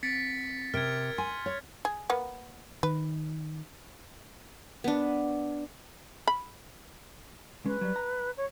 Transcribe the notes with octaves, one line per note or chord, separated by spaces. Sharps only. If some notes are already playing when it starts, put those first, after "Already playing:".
C4 A6 B6 C#7 D7
C3 A#4 F6 G#6 D7
G#5 C6
C#5
G#4
A#3 B3
D#3 B4
B3 D4
B5
G#3 C#4 B4
F#3 G3
A#5
C#5